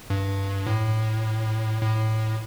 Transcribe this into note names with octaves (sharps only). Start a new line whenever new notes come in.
G2
A2
A2